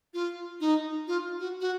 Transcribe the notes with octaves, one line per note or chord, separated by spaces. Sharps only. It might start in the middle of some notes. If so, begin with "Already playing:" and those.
F4
D#4
F4
F#4
F#4